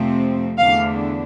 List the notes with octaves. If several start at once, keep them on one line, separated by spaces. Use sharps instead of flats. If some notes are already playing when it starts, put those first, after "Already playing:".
Already playing: F2 C3 F3 A3 C4
E2 D3 A3 D4 F5